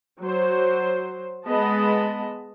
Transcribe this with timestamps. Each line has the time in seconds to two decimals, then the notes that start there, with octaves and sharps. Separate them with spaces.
0.20 F#3 C5
1.47 G#3 B3 D#5 A5 B5